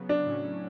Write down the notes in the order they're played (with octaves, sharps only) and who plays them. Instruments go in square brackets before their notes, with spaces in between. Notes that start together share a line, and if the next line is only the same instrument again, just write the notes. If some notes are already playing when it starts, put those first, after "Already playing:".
Already playing: [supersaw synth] C#3 F#3 B3
[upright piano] D4
[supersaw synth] A2 F#3 C#4